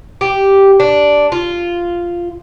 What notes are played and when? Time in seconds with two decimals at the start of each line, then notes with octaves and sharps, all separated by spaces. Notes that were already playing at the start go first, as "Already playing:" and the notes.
0.21 G4
0.80 D4
1.32 F4